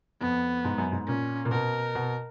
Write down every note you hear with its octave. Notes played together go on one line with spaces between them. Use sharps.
F2 B3
G#2
F#2
G#2
A#2 C#4
A#2
B2 A#4
B2